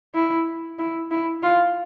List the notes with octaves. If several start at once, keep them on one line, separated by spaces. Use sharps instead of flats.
E4
E4
E4
F4